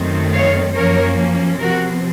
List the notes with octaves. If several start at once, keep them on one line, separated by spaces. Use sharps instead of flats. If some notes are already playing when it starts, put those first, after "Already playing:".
Already playing: F#2 D#3 A3 C4
C#5 F5
F#2 F3 A#3 C#4 A#4 C#5
C3 F3 C4 F#4 A#4